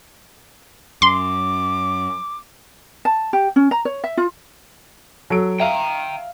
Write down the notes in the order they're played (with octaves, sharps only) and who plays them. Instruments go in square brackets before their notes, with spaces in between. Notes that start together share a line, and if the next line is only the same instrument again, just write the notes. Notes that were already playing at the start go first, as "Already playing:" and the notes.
[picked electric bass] F#2 [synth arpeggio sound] C6 [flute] D6
[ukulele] A5
G4
C#4
A#5
C#5
E5
F4
[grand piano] F#3 A4 D7
[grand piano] E5 F5 [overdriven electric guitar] G5 A#5